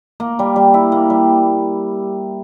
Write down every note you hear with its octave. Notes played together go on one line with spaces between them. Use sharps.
A#3
G3
G3
E4
A#3
G3